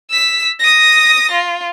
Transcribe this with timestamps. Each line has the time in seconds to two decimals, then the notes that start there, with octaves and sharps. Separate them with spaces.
0.10 E6 B6
0.60 D#6 A#6
1.32 F4